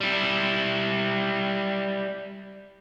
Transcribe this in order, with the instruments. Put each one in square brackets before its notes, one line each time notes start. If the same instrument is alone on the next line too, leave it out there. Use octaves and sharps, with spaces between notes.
[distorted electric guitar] G3 E4